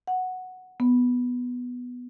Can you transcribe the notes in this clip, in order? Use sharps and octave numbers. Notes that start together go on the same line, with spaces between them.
F#5
B3